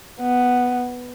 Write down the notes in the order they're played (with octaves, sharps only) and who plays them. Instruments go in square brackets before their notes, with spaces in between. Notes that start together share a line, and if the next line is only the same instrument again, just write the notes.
[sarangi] B3